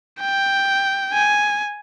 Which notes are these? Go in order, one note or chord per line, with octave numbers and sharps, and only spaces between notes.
G5
G#5